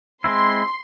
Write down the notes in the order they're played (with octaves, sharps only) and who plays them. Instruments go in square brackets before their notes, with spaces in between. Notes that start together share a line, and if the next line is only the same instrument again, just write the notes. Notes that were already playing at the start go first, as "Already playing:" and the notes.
[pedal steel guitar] G#3 C4 E4 [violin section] C6